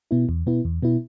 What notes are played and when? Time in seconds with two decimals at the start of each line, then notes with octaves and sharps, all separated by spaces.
0.11 B2 B3 E4
0.29 E2
0.46 B2 B3 E4
0.65 E2
0.83 B2 B3 E4